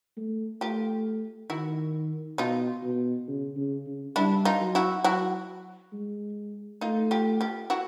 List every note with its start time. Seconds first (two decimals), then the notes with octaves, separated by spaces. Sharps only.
0.17 A3
0.61 A3 F4 G4
1.50 D#3 E4 F#4
2.38 B2 D#4 F4
2.83 B2
3.28 C#3
3.56 C#3
3.86 C#3
4.16 G3 D4 E4
4.45 D#4 F4
4.60 F#3
4.75 E4 F#4
5.04 F#3 E4 F#4
5.93 G#3
6.81 A3 D#4 F4
7.11 F4 G4
7.41 F4 G4
7.70 E4 F#4